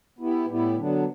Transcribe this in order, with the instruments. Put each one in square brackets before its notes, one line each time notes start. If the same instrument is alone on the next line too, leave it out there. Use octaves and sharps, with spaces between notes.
[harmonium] B3 E4 G4
A2 G3 B3 E4 G4
D3 F#3 B3 D4